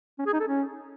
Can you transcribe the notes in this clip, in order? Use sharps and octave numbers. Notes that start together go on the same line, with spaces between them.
C#4
G#4
D#4
A4
C#4